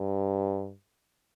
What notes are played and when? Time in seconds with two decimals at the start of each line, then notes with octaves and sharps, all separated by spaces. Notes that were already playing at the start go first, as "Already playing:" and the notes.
Already playing: G2